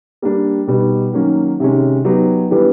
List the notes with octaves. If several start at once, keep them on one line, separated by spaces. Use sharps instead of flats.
G3 A#3 D4 G4
B2 G3 B3 D#4
D#3 F#3 A#3 C#4
C3 D#3 G#3 C#4
F#3 B3 D#4 G4
E3 G3 B3 D4 G4